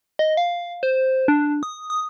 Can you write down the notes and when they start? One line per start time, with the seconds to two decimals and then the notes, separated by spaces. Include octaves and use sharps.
0.19 D#5
0.37 F5
0.83 C5
1.28 D4
1.63 D#6
1.90 D#6